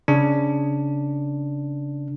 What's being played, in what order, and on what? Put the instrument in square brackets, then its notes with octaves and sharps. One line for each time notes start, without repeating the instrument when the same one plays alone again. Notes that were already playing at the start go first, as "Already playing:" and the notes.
[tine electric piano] C#3 D4